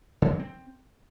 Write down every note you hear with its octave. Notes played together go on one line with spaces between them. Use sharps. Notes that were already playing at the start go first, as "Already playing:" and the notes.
C#3
F#3
C4